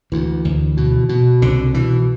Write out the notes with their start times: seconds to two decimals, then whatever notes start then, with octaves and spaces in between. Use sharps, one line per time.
0.12 D2 E3
0.45 D2
0.77 B2
1.09 B2
1.42 C2 D3
1.74 B2 E3